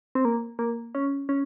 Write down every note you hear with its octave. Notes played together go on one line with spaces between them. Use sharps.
C4
A#3
A#3
C#4
C#4